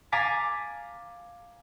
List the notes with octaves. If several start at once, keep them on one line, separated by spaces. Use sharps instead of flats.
F5 G#5 A#5 D6 A6 B6